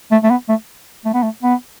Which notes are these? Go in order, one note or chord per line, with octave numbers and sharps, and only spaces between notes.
A3
A3
B3
A3
A3
B3
A3
B3